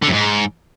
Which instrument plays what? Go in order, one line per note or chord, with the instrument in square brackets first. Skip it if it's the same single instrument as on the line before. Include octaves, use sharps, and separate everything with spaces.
[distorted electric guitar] D3
F#2
G#2